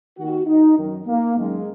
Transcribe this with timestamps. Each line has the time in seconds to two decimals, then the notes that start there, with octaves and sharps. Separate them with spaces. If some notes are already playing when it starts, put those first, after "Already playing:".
0.17 D#2 D#3 F#4
0.47 D#4
0.77 F#2 D#3
1.07 A#3
1.37 F#2 D#3 G#3